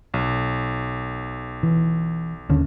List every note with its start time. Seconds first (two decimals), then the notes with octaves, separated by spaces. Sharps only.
0.14 B1
1.63 E3
2.50 D#2 D3 C#4